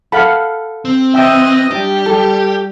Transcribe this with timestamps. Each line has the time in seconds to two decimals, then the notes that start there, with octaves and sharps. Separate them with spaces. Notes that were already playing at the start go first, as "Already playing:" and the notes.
0.12 A4 F5 F#5 B5
0.85 C4
1.14 E3 D#5 E5 G5 E6
1.71 G3 D4 G4
2.06 A4